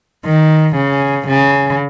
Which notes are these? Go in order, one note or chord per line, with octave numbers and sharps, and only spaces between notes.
D#3
C#3
C#3